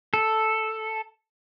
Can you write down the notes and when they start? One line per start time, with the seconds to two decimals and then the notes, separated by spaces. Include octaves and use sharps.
0.14 A4